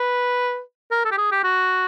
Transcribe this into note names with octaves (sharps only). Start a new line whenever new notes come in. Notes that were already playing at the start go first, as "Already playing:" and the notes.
Already playing: B4
A#4
A4
G4
G#4
G4
F#4